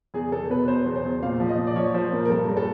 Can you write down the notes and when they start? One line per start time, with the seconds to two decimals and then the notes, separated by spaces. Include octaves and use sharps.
0.14 E2 G#4
0.32 E2 A4
0.50 B2 B4
0.68 B2 C5
0.86 E2
0.96 C5
1.05 E2
1.23 A#2 F5
1.40 F3
1.49 D#5
1.58 A#2
1.67 D5
1.76 F3 C#5
1.94 F3 C5
2.12 A#2 A#4
2.25 A#4
2.30 G2 A4
2.48 G2
2.57 A4